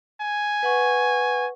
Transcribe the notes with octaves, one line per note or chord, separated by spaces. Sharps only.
G#5
B4 F#5 C#6